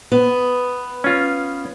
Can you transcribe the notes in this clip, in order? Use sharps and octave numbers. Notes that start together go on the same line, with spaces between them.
B3
C#4 F4